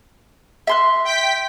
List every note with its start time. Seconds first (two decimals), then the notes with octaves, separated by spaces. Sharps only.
0.67 E5 C6 F#6
1.05 G5 B6